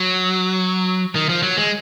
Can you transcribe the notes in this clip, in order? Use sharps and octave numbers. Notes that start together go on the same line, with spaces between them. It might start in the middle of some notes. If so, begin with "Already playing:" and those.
Already playing: F#3
D#3
F3
F#3
G#3